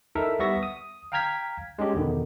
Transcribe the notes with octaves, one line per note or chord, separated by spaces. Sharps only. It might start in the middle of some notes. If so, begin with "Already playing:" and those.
D#4 E4 A4 A#4 E5
G3 B3 E5 C#6 A#6
D#6
F5 G5 A#5 F6 G#6 B6
G#3 C#4 D4 G4
E2 B2 D3 D#3